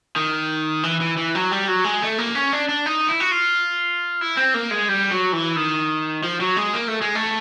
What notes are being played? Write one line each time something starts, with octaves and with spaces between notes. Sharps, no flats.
D#3
E3
E3
E3
F#3
G3
F#3
G#3
A3
A#3
C#4
D4
D4
D#4
E4
F#4
F4
E4
C4
A#3
G#3
G3
F#3
E3
D#3
F3
F#3
G#3
A#3
A3
G#3
A3